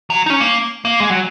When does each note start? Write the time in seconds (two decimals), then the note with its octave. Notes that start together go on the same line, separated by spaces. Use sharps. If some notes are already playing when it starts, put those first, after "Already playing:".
0.10 F#3
0.26 D#4
0.30 C#4
0.40 A#3
0.85 A#3
1.00 G#3
1.10 F#3